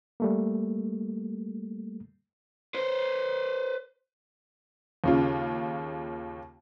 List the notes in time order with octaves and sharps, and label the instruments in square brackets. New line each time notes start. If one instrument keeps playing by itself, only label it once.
[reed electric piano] G3 A3 A#3
[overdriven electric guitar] B4 C5
[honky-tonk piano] D#2 C#3 F4